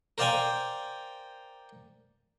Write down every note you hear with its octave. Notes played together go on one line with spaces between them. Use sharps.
A#4 C5 D5 F5 G5 G#5